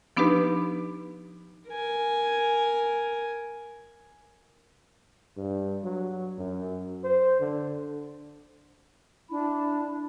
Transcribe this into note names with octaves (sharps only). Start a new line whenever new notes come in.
F3 B3 D4 D#4 G4 B4
A#4 G#5
G2
F#3
F#2
C5
D3
D4 E4 B5